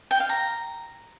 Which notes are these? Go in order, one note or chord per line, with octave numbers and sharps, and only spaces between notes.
G5
F5
A#5